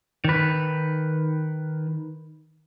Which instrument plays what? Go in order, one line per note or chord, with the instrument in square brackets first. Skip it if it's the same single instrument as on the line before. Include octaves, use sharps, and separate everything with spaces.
[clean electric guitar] D#3 B4